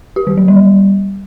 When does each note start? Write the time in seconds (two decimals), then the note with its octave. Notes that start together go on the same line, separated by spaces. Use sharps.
0.16 G4
0.27 D#3
0.37 F#3
0.48 G3